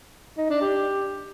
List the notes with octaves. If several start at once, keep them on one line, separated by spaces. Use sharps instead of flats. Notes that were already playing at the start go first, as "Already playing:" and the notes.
D#4
D4
G4